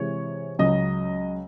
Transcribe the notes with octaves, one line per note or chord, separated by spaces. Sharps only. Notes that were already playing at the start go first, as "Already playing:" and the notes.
Already playing: C3 E3 G#3 C#5
C#2 C#3 F#3 D#5